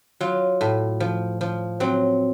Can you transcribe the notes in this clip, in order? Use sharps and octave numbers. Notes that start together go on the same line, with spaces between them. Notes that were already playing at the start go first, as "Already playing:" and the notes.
F#3 F4
A2
F3
F3
F#3 C4